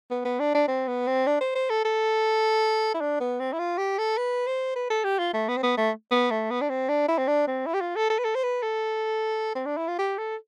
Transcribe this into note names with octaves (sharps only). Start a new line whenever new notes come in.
B3
B3
D4
D4
C4
B3
C4
D4
C5
C5
A4
A4
E4
D4
B3
C4
E4
F4
G4
A4
B4
C5
B4
A4
G4
F4
A3
B3
C4
B3
A3
B3
A3
B3
D4
C4
D4
E4
C4
D4
C4
E4
G4
F4
A4
A4
B4
A4
C5
B4
A4
C4
D4
E4
F4
G4
A4